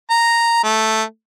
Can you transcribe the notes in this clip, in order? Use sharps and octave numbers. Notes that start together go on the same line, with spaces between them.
A#5
A3